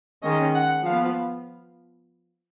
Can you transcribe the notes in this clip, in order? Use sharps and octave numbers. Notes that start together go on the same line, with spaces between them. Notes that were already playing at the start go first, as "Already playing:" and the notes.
D#3 G#3 C#4 D#5
F#5
F3 F5
B3